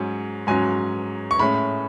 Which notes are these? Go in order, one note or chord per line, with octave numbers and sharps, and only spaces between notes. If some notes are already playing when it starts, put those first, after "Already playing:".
Already playing: G#2 F#3 C#4
G#2 F#3 C#4 G#5
C#6
A2 G#3 C#4 B5